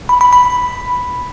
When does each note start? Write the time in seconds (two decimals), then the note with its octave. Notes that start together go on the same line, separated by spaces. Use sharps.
0.09 B5
0.21 B5
0.33 B5